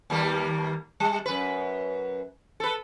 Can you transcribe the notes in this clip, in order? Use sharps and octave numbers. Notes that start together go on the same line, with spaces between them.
D#2 G3 A#3
G3
F#2 B4
A4 B4